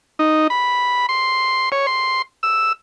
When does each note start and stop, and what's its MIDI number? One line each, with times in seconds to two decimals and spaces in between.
0.19 0.47 63
0.50 1.06 83
1.09 1.69 84
1.72 1.86 73
1.87 2.22 84
2.43 2.73 88